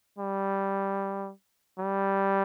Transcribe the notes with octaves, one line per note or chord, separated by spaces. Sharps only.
G3
G3